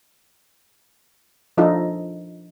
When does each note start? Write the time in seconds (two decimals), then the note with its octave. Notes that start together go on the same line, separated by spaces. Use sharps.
1.57 F3 D4 D#4 F4 A4